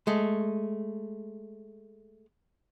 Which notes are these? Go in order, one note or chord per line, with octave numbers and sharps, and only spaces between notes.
G#3 A3